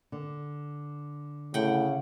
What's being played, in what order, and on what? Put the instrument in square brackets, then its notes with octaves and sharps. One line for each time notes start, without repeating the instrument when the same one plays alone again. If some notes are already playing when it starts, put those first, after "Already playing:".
[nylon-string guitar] D3
[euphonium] A2 [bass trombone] C#3 [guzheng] F#5 G5